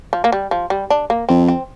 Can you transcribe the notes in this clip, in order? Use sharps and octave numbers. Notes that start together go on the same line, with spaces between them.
F3
A#3
G3
F3
G3
D4
A#3
F2 C4
C4